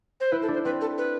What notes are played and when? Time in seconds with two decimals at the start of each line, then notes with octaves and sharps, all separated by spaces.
0.20 C5
0.32 E4 B4
0.42 A4
0.48 D4
0.54 C5
0.65 C4 B4
0.81 A4
0.98 B4